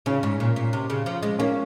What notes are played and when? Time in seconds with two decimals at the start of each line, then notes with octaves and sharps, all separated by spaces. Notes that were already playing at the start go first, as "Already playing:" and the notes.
0.06 C#3 C#4
0.23 G#2
0.40 A#2
0.56 A#2
0.73 C3
0.90 C#3
1.06 F3
1.23 G#3
1.39 A#3 C#4